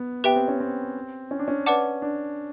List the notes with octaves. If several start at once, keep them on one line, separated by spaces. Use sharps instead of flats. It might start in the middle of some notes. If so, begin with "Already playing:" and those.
Already playing: B3
B3 G4 B4 E5 G5
C4
C#4
C4
C#4
D4
C#4
B4 D5 F#5 A5 D6
D4